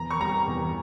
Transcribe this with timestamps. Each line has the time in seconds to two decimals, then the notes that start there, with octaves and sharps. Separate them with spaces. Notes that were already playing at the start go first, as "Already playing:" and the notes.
Already playing: E2 A#5
0.11 C#6
0.20 G3 A#5
0.48 E2